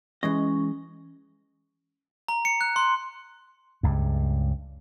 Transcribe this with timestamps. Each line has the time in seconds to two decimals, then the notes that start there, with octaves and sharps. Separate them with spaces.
0.23 E3 G#3 C#4 D#5
2.28 A#5
2.45 C#7
2.61 F#6
2.76 C6
3.83 C#2 G2